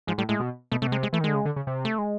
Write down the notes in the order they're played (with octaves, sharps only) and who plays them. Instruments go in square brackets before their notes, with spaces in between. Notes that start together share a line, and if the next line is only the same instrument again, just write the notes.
[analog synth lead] G#2 [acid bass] F3
[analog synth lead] A2 [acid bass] G3
[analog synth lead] A2 [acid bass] G#3
[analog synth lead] B2
[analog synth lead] B2 [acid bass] A3
[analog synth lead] C3 [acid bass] A3
[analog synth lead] B2
[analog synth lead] C3 [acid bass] G#3
[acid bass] G#3
[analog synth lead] E3 [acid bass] A3
[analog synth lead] D#3
[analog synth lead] D3 [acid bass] G#3
[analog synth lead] C#3
D3
C#3
C3
[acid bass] A3
G#3